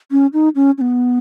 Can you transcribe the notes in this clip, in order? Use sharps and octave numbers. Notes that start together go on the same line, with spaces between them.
C#4
D#4
C#4
C#4
B3